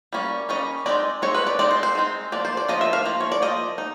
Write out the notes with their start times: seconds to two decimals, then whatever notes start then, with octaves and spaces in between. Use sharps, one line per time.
0.13 G3 A#3 C#4
0.49 G3 A#3 C#4 D#5
0.86 G#3 C4 D#4 D5
1.22 G#3 C4 D#4 C#5
1.35 B4
1.47 D5
1.59 G#3 C4 D#4 D5
1.71 C5
1.83 C5
1.95 G#3 C4 D#4
2.32 F3 A#3 D5
2.45 C5
2.57 D5
2.68 F3 A#3 D#5
2.81 E5
2.93 F5
3.05 F3 A#3
3.20 C#5
3.32 D5
3.42 F3 A#3 D#5
3.78 D#4